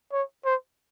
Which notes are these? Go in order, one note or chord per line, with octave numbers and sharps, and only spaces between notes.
C#5
C5